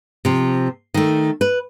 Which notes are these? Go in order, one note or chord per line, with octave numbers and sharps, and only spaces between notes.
C3 F3
D#3 A3
B4